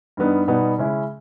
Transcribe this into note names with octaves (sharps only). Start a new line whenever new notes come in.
G2 G3 B3 D#4
B2 G3 B3 D#4
C#3 G#3 C#4 E4